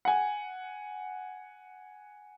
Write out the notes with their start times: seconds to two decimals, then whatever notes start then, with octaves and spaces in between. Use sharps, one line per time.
0.05 F#5 G#5